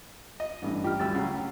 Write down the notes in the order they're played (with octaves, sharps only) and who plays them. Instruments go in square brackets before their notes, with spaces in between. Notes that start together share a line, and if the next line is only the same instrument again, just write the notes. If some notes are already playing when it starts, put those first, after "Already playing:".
[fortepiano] D#5
[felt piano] A1 G2
[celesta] F4 F6 [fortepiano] G4 [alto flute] G5
[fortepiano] D2 G3 E6 [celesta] F#4 A6
[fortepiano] C#3 F#3 [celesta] F#5